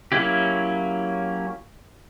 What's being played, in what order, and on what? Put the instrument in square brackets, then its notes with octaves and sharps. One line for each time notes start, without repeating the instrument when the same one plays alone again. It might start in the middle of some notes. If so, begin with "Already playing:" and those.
[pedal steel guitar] F#3 A#3 C#4 E4 G4